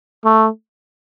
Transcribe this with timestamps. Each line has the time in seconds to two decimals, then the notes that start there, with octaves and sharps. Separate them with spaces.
0.25 A3